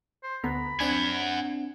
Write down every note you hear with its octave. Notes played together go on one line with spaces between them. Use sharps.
C5
D2 B3 A#5 B5
C4 D4 F#5 G#5 G#6